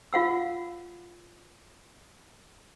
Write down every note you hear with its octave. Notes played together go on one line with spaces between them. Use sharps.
F4 F5 F#5 E6